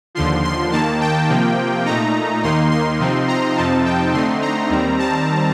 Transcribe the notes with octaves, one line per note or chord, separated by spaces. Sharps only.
D#2 D3 F3 C6
C6
D#2 D#3 A#3 A5
G5
C3 F3 A#3
A#2 A3 D#4 A#5
D#2 D#3 A#3 D#4 C6
C6
C3 F3 C4 D#4
A#5
F2 C3 F3 C4 D#4 A5
G5
D3 A3 C4 D#4 C6
A#5
D#2 D#3 G3 C4
A5